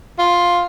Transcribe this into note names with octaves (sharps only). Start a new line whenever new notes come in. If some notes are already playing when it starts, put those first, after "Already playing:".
F4